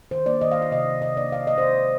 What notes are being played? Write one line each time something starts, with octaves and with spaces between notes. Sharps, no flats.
D#3 C5
A#3 D5
D#3 D#5
F5
A#3
F5
C3 D#5
D#3 A#3
C3 D#5
D#3 A#3 D5
D#3 F5
G#3 D#5
C5
D#3 D5
G#3